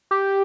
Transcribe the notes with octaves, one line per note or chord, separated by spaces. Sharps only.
G4